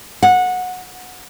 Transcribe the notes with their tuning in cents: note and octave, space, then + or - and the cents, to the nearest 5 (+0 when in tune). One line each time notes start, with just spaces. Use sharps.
F#5 -20